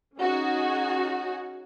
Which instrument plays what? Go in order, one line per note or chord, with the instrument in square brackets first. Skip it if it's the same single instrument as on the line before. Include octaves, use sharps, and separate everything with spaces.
[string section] C#4 D#4 F#4 G#4